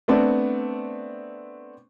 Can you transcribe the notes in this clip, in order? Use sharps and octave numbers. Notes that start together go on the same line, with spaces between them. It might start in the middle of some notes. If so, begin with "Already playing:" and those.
A3 B3 C4 D4